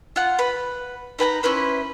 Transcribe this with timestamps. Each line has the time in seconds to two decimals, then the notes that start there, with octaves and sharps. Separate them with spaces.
0.16 F4 F#5
0.39 B4
1.19 D#4 B4 G#5 A#5
1.43 C#4 E4 B4 C5